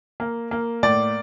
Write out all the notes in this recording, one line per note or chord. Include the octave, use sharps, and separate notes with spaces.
A#3
A#3
A2 D5